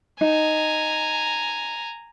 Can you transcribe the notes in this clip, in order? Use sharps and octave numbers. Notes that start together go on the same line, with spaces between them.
D#4 G#5 A#5